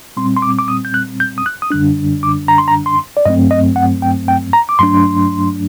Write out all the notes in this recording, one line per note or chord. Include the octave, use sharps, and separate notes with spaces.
A#2 G3 C4 C6
C6
D6
D6
D#6
G6
F#6
G6
D#6
F#6
D#6
F#2 D3 G3 D4 F#6
D6
A#5
C6
A#5
C6
D5
G2 F#3 A3 C4 D#5
D#5
F#5
G5
G5
A#5
D6
G2 F#3 A3 D4 C6